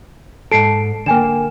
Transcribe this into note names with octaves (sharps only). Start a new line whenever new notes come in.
G#2 A4 C7 D7
D3 A#3 G5 G#5 E7